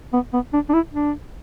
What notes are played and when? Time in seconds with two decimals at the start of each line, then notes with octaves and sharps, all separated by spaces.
0.13 B3
0.33 B3
0.53 D4
0.69 D4
0.73 E4
0.93 D4